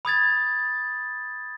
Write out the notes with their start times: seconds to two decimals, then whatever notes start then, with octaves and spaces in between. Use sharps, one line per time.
0.05 B5 D#6 G#6 A6